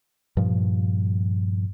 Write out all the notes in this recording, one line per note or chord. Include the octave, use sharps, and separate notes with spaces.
G2 A#2 F3